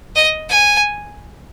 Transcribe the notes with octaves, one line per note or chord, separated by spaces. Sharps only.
D#5
G#5